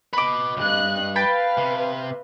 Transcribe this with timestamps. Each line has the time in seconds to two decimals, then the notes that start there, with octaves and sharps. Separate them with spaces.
0.13 B4 D#5 B5 D6
0.57 C#2 G2 D#5 F#6
1.16 B4 F5 G5 A5 B5
1.57 C3